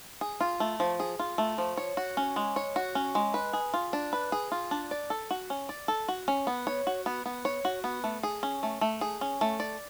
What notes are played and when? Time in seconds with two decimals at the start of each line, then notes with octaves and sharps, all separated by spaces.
0.21 G#4
0.40 F4
0.60 A3
0.80 F3
1.00 G#4
1.19 F4
1.38 A3
1.58 F3
1.77 C#5
1.97 F#4
2.17 C#4
2.36 G#3
2.56 C#5
2.76 F#4
2.95 C#4
3.15 G#3
3.34 B4
3.53 G#4
3.74 F4
3.93 D4
4.13 B4
4.32 G#4
4.52 F4
4.71 D4
4.91 D5
5.10 A4
5.31 F#4
5.50 C#4
5.69 D5
5.88 A4
6.08 F#4
6.28 C#4
6.47 B3
6.67 C#5
6.87 F#4
7.06 B3
7.26 B3
7.45 C#5
7.65 F#4
7.84 B3
8.04 A3
8.23 G#4
8.43 C#4
8.63 A3
8.81 A3
9.01 G#4
9.21 C#4
9.41 A3
9.60 D5